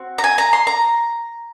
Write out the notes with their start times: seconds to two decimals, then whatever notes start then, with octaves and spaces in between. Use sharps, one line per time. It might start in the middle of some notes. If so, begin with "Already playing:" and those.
Already playing: C4 F#4
0.18 A#5
0.24 G#5
0.38 A#5
0.53 C6
0.67 A#5